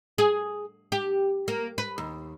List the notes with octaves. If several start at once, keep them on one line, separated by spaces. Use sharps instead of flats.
G#4
G4
A#3
B4
D#2